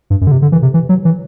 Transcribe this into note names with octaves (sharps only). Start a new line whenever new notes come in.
G2
F#2
D3
C3
D3
E3
C3
E3
F#3
E3